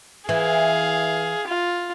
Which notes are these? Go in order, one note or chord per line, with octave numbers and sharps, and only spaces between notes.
E3 G#4 F5
F4